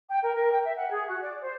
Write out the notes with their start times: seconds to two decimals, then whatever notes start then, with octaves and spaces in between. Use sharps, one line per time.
0.10 G5
0.21 A#4
0.35 A#4
0.51 G5
0.63 E5
0.76 F#5
0.91 G#4
1.06 F#4
1.21 D5
1.41 C5